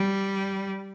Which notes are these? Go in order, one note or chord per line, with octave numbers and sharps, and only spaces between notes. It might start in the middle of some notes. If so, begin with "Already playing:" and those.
Already playing: G3